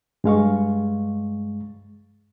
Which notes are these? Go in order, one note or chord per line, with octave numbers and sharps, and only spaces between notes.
G2 G#3 F5 C#6